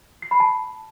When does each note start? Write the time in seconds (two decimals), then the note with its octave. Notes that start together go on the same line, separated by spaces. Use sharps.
0.22 C7
0.31 B5
0.40 A5